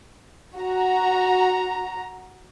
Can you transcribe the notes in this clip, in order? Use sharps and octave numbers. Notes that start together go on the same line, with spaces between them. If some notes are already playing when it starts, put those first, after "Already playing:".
F#4 A#5